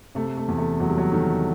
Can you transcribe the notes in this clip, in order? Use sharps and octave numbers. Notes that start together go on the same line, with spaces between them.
C3 A3
A3
E2
A3
E2 F#3
G3
F#3
D#3 A3